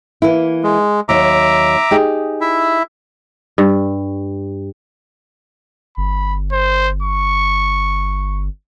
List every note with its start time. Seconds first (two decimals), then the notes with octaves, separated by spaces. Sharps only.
0.22 E3 A#3 E4
0.64 G#3
1.09 D#2 F#3 E5 A#5 D6
1.91 D#4 G4 G#4
2.41 E4 E5
3.58 G2
5.97 G1 B5
6.52 C5
7.03 C#6